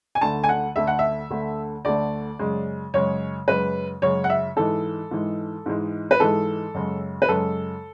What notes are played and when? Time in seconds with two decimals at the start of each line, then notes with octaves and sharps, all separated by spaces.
0.15 G#5
0.21 D2 D3 A3 A5
0.44 G#5
0.49 F#5
0.76 D2 D3 A3 E5
0.87 F#5
0.99 E5
1.30 D2 D3 A3
1.85 D2 D3 A3 D5
2.39 F#2 C#3 G#3
2.94 F#2 C#3 G#3 C#5
3.48 F#2 C#3 G#3 B4
4.02 F#2 C#3 G#3 C#5
4.24 F#5
4.30 E5
4.56 G#2 E3 G#3 A4
5.11 G#2 E3 G#3
5.66 G#2 E3 G#3
6.11 B4
6.20 G#2 E3 G#3 A4
6.74 F#2 C#3 G#3
7.22 B4
7.29 F#2 C#3 G#3 A4